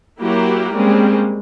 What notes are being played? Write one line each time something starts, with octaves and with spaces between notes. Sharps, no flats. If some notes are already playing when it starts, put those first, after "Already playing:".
F#3 A#3 E4 F#4 G4 A#4
G3 G#3 A#3 C4 C#4